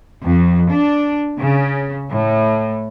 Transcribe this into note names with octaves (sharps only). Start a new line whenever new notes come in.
F2
D4
C#3
A2